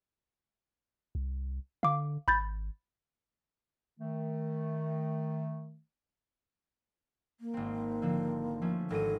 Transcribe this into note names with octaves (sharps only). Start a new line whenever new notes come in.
C2
D3 F5 D6
G#1 B5 G6 A6
D#3 A3
A#3
G#1 C4
D3 F3 C4
F3 A3 C#4
G#1 A4 A#6 D#7